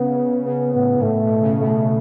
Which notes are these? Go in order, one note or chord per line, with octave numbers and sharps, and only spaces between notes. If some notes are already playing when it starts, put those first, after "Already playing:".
Already playing: C#3 B3
C#3 B3
A2 B3
G#2
A2 A3
B2
C#3
B2 A3